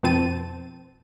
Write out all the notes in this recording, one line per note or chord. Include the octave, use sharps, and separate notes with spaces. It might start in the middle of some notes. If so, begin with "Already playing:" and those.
F2 B2 C4 A5 D#7